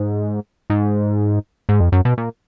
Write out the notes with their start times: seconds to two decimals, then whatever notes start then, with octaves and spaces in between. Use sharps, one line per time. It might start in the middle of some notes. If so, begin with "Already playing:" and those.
Already playing: G#2
0.70 G#2
1.69 G#2
1.80 F2
1.92 F#2
2.05 B2
2.18 A#2